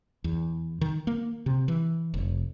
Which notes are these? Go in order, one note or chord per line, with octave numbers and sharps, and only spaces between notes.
E2
D#3
A#3
C3
E3
F1